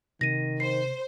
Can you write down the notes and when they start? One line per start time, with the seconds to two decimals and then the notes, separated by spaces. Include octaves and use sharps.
0.21 C3 D#3 A#6 D#7
0.60 C5 C7